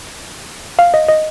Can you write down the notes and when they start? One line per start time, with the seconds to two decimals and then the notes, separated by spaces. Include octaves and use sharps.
0.79 F5
0.94 D#5
1.09 D#5